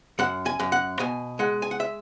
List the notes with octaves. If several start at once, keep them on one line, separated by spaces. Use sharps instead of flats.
F#2 F#5
G#5
F#2
F#5
B2 G#5
G#3 F#5
G#5
F#5
E5